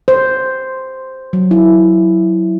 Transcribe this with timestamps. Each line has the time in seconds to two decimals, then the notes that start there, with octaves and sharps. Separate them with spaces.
0.08 C5
1.33 F#3
1.51 E4